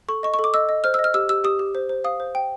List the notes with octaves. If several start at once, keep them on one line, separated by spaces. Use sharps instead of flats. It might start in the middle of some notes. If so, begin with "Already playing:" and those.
A4 C#6
D#5 C#6
C#6
A4
D6
D#5 E6
D#5
C5 F6
E6
D#5
F6
G4 E6
G4 E6
G4 D#6
G4
C5
C5
F5 D#6
C5
G5